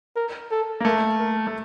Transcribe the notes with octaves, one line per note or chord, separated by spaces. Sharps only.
A#4
A4
A#3
A3 A#4
A#4
A3